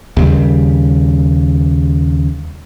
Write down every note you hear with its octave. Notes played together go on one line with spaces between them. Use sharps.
D#2 C#3 G3